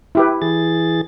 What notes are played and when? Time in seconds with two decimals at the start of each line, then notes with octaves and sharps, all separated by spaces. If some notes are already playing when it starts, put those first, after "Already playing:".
0.15 E4 G4 B4
0.42 E3 G#4 A6